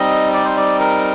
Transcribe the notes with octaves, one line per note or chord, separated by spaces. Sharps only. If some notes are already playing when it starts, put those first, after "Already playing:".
Already playing: G3 C4 D#4 D#5
D5
C5
D5
A#4